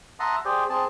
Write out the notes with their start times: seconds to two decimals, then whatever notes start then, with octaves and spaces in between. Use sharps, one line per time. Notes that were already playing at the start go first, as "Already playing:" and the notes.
0.20 E5 F#5 A5 A#5 C6 D#6
0.45 G4 G#4 C5 D5
0.70 C4 G#4 A5